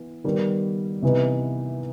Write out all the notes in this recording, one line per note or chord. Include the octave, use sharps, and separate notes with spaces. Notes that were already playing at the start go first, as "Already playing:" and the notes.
Already playing: E3 B3
D#3 G3 B3
C3 E3 B3 D#4